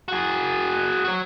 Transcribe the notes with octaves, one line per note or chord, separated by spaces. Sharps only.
F#4 G#4
F#4 C#5